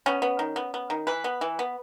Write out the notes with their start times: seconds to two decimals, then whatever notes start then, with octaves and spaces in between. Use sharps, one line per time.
0.06 B3 C#4
0.22 B3
0.39 D#3
0.56 B3
0.74 B3
0.90 D#3
1.07 E3 B4
1.24 B3
1.41 E3
1.59 B3